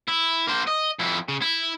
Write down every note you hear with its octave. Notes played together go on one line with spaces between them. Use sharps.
E4
A#3 C5
D#5
F2 E4
C#3
E4